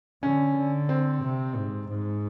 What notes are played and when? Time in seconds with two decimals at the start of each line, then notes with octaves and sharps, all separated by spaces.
0.23 D3 C#4
0.56 D3
0.89 C4
1.23 C3
1.55 G#2
1.88 G#2